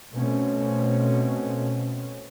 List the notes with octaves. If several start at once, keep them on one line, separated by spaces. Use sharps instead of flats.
B2 A3 C4 C#4